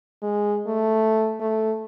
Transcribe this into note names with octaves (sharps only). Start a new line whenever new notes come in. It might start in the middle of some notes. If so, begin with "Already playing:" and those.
G#3
A3
A3